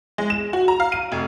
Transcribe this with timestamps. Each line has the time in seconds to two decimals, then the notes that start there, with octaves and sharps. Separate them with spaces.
0.18 G#3
0.30 E7
0.53 F#4
0.68 A#5
0.80 F5
0.92 D#7
1.12 F1